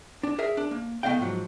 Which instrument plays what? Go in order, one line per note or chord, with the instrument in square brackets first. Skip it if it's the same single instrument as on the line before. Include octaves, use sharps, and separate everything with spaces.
[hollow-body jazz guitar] D4
G#4 A#4 E5
D4
A#3
A3 B3 D4 D#5 F5 G5
G#2 F3 F#3